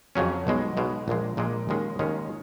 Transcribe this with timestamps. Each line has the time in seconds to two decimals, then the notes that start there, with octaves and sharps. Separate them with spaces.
0.15 F2 C#3 F#3 C#4
0.47 B1 B2 G#3
0.77 B1 B2 G#3
1.08 A#1 A#2 G#3
1.37 A#1 A#2 G#3
1.69 D#2 D#3 G#3 C#4
1.99 D#2 D#3 G#3 C#4